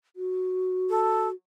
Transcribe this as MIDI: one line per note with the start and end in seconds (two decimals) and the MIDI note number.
0.16 1.33 66
0.89 1.28 69